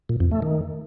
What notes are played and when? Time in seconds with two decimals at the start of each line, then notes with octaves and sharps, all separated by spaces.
0.09 A#2
0.20 F2
0.31 A3
0.42 D#3